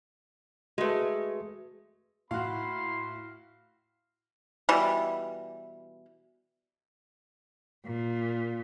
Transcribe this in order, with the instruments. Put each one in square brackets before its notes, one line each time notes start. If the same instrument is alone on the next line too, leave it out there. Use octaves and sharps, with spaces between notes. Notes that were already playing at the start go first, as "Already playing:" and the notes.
[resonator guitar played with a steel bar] G#3 A3 [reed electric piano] F#4 G#4 B4
[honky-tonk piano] A2 [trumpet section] A#3 B5 C6 [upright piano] F#4 F5
[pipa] B2 E3 G3
[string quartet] A#2